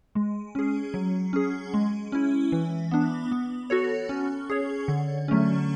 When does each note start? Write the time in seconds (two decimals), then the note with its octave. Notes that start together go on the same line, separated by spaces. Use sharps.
0.15 G#3
0.55 C#4 G#4
0.94 F#3
1.33 C#4 G#4
1.74 G#3
2.12 C#4 E4
2.52 E3
2.91 B3 D4
3.31 B3
3.70 F#4 A4 C#5
4.09 C#4
4.50 G#4 C#5
4.88 D3
5.28 F#3 A3 C#4